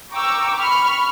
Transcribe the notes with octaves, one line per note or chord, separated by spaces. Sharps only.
G5 A#5 C#6 D6 E6
B5 C#6 F6